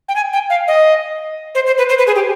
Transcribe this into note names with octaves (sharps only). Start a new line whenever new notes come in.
G5
G#5
G5
F5
D#5
C5
C5
B4
C5
B4
G#4
G4